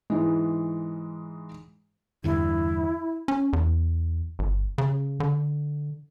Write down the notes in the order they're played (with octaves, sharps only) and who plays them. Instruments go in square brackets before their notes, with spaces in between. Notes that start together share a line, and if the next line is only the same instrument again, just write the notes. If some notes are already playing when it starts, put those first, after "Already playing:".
[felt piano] G#2 E3 G#3
[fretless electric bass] E2 G2 D3 [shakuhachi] E4
[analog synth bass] C#4
E2
G1
C#3
D3